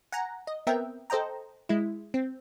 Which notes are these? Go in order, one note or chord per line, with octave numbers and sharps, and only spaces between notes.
F#5 G#5 A#5
D#5
B3 C4 A#4 E5 G5
A4 C5 D#5 G5 A#5
G#3 E4
C4